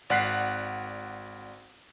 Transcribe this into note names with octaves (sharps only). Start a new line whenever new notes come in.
G#1 D5 F#5 F#6 B6 C7